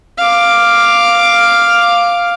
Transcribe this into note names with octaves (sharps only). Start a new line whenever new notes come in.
F5 D6